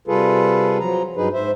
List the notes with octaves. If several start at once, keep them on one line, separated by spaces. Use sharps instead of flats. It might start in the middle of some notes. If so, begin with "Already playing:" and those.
C3 G3 F4 G#4 A4 B4
F3 F#3 A#5
G2 F#3 D#4 G#4 B4
G#2 C5 E5